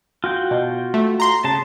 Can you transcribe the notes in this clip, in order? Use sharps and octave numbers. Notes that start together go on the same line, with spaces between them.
F4 F#4 G5
B2
A3
A#5 C6
C#3 A5